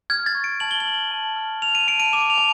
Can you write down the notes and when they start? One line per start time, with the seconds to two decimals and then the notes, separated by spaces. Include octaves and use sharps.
0.10 F6 G#6
0.26 A6
0.35 C#6
0.44 D7
0.60 A5 F#7
0.71 G7
0.80 F#7
0.86 F6
1.11 A5
1.36 F6
1.62 F6 F7
1.75 D#7
1.87 A5 D7
2.00 D#7
2.13 D6 E7
2.30 F7
2.38 A5